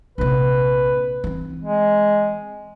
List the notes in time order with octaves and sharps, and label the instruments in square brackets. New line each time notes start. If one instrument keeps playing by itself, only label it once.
[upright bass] A#1 C3 [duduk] B4
[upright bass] E3 C4
[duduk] G#3